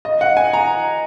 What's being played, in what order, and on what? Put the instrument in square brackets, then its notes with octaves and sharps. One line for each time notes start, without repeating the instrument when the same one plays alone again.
[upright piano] D#5
F#5
G#5
A#5